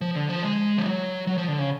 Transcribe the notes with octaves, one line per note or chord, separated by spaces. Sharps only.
F3
D3
F3
G#3
F3
F#3
F#3
F3
D3
C#3